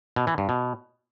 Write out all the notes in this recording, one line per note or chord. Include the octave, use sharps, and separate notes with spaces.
B2
E3
G2
B2